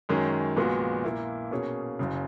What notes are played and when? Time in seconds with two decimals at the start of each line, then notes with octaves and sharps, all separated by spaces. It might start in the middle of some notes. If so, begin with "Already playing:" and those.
0.09 F#2 D#3 G#3 C#4
0.57 A#1 A#2 G#3 B3 F#4
1.04 A#2 A#3 E4
1.51 B2 A#3 C#4 G#4 C#5
1.99 F#1 F#2 C#3